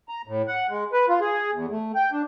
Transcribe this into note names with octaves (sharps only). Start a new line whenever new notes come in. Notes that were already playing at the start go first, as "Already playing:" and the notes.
A#5
A2
F#5
G#3
B4
F4
G#4
E2
A3
G5
D4